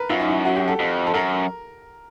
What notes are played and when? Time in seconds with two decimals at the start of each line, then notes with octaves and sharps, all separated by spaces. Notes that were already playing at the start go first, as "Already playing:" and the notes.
Already playing: A#4 B4
0.10 F#2 F4
0.20 D#4
0.28 E4
0.45 F#4
0.56 G4
0.68 A4
0.80 F2
1.07 A4
1.14 F#2 A#4